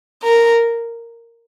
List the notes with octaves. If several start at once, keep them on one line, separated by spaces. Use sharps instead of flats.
A#4